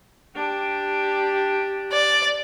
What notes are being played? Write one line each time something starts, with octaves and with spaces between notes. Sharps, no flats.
D4 G4
D5